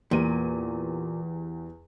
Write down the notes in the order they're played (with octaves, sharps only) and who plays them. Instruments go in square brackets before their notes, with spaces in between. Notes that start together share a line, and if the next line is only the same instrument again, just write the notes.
[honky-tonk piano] E2 G4 D#7 [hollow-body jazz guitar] A#2